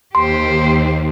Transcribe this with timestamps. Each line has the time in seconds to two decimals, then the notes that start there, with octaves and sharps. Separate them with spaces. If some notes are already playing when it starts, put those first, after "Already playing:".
0.15 D#2 G4 C5 C6